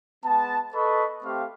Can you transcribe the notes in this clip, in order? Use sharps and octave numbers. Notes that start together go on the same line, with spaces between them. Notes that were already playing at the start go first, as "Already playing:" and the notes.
G#3 B3 A5
A4 B4 D#5 B5 C#6
A3 C4 G4 F5